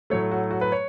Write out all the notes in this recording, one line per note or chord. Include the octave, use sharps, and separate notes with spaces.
A2 F#3 A3 C#5
F#4
F#4
B4
C#5